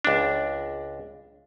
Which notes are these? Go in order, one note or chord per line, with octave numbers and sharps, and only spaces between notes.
C#2 D4